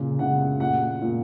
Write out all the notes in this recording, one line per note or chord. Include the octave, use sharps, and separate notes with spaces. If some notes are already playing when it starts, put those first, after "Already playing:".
Already playing: A#2 C#3
C#3 F#5
A#2 F#5
A#2